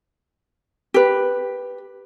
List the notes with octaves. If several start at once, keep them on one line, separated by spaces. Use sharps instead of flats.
G4 B4